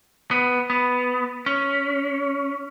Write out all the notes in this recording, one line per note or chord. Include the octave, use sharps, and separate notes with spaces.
B3
B3
C#4